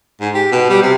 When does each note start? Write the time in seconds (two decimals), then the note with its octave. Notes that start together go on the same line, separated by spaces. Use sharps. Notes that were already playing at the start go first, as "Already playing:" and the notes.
0.21 G#2
0.35 G4
0.52 B2
0.70 G3
0.82 C3